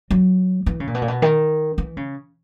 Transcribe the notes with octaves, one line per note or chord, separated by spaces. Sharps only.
F#3
E3
C#3
A#2
B2
A#2
B2
D#3
E3
C#3